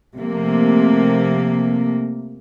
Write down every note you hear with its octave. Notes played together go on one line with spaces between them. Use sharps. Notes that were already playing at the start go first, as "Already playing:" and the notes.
C3 F3 A3 A#3